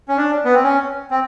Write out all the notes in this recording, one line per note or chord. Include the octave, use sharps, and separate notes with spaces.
C#4
D4
B3
C4
C#4
C4